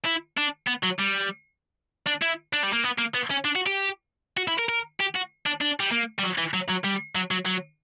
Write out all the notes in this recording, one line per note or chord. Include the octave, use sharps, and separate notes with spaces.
E4
D4
B3
F#3
G3
D4
E4
D4
G3
A#3
B3
A#3
B3
C#4
D4
F#4
G4
F#4
E4
A#4
A#4
G4
F#4
D4
D4
G3
A#3
G3
F#3
E3
F#3
F#3
G3
F#3
F#3
F#3